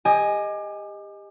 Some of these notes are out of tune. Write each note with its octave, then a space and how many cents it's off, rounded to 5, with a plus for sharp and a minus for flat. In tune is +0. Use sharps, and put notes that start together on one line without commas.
G4 +30 D#5 +0 G#5 +0